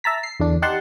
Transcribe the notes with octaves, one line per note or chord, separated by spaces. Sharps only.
E5 A5 A#5 B6
C7
E2 D3 D4
D#4 G4 F#5 A5 C6